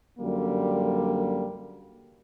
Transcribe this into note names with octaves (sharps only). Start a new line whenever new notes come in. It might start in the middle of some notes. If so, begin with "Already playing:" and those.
F#2 D3 G3 A#3